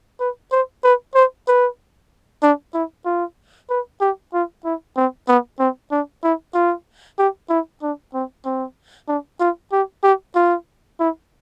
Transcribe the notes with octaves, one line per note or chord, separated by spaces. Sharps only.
B4
C5
B4
C5
B4
D4
E4
F4
B4
G4
F4
E4
C4
B3
C4
D4
E4
F4
G4
E4
D4
C4
C4
D4
F4
G4
G4
F4
E4